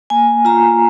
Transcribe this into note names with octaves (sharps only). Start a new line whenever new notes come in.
A#3 G#5
F4 A#5